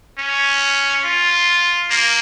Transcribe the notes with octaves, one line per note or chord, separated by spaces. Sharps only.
C#4
F4
A#3